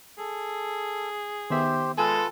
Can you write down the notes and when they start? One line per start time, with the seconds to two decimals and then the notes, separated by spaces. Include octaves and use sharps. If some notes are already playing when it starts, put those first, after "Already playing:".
0.18 G#4 A4
1.50 D#3 B3 G4 C5 E5
1.98 G#3 F4 A4 B4 G#5